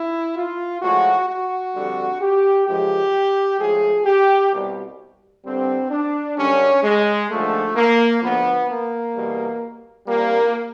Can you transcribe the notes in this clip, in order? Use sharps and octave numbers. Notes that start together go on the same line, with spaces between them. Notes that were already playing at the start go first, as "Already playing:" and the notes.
Already playing: E4
F4
A2 F3 G#3 F#4
F#4
F2 D3 G3
G4
F#2 C#3 F3 G#3 G4
A2 F3 G#3 G#4
G4
C2 B2 G3
G2 D3 G3 C4
D4
F#2 D3 G3 C#4
G#3
D#2 D3 F3 G#3 A3
A#3
D2 D3 F3 B3
A#3
E2 B2 G3
C2 A#2 G3 A#3